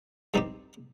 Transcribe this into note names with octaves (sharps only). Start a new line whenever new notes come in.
G2 G3 C4 D#4 G4